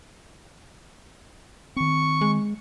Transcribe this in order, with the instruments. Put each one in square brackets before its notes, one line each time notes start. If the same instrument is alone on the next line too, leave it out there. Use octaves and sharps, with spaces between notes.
[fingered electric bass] D#3 C4 [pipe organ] C#6
[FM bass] G#3